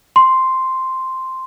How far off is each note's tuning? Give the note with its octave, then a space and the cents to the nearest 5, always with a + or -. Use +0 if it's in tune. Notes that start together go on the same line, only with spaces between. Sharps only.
C6 +0